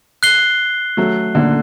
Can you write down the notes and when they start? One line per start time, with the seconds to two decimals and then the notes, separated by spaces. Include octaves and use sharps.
0.23 F#6 C7 G7
0.97 F#3 A3
1.35 A#2 D3